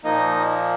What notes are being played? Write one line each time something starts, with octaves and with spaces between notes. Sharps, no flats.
A#2 F3 A#3 D#4 D#5